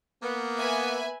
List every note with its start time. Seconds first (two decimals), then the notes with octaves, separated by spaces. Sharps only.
0.23 A#3 B3
0.59 B4 E5 G#5